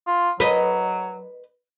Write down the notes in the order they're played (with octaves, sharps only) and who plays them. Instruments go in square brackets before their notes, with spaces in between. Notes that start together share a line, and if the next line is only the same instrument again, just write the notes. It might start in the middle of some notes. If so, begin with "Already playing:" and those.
[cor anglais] F4
[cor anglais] F#3 [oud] B4 D#5